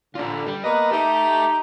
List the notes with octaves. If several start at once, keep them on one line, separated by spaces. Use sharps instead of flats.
D3 D4 F4
G3
A#3 B3 B4 D#5
D#4 G4 A4 E5